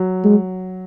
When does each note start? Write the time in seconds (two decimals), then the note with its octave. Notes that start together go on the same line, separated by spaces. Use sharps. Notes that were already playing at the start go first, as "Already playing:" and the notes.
Already playing: F#3
0.24 G#3